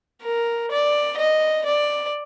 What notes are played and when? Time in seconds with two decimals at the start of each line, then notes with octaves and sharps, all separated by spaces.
0.23 A#4
0.72 D5
1.18 D#5
1.66 D5